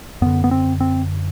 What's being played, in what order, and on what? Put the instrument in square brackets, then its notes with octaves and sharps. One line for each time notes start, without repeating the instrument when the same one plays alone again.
[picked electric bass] F#2 D3 B3
B3
C4
C4